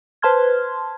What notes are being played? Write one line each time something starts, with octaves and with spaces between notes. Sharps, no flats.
B4 C5 A5 C6 F6 G#6